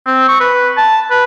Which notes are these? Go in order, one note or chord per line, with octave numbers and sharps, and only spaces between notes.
C4
C#6
B4
A5
B4